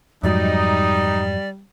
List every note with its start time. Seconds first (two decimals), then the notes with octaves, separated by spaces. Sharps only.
0.23 F2 G#2 F#3 G3 D#4 D5